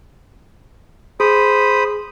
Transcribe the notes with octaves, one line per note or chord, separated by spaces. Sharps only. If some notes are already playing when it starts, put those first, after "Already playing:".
G#4 C5 B5 D#6